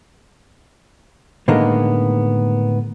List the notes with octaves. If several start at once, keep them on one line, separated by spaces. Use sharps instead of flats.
A2 D3 D#3 G#3 A#3 B3